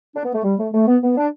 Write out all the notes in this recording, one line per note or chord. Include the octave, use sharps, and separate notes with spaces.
D4
B3
A3
G3
A3
A3
B3
B3
D4